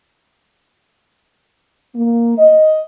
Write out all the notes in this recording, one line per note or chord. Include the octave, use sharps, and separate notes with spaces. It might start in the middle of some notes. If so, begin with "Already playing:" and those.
A#3
D#5